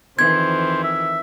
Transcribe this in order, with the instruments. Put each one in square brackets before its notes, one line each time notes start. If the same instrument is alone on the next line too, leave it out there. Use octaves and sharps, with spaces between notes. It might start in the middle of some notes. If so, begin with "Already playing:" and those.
[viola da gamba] F2 D#3 E3 [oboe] C5 [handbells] G#6
[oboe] E5